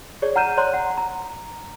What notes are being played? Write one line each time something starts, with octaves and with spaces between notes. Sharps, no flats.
G#4 C#5 D5
F#5 A#5 F6 G6 D#7 E7
C#5 D5 A#5 C6 F#6
F#5
A#5